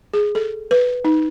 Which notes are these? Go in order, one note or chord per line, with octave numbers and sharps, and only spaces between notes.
G#4
A4
B4
D#4